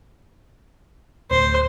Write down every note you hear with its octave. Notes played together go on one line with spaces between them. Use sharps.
D1 C5